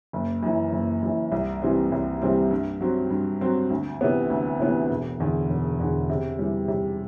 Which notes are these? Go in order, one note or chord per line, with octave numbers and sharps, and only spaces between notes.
F#1
F#2 E3
F#1
F#2 E3
C2
C3 E3 G3 C4
C2
C3 E3 G3 C4
G2
F#3 C4
G2
F#3 C4
D2
C3 E3 B3
D2
C3 E3 B3
E1
E2 D3
E1
E2 D3
C3
E3 G3
C3